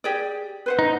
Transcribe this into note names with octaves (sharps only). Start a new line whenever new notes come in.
G4 G#4 D5
B4 C5 F#5
D#4